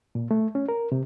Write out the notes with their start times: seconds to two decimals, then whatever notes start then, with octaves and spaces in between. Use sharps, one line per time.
0.15 A#2
0.31 A3
0.55 C#4
0.69 A#4
0.92 C3